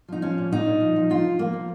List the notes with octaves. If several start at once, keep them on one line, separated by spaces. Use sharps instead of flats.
F3 D#4
F3 C#4
A#2
A#2 D#4
A#2
F3
F3
F3 F4
F3
F3 A#3
F3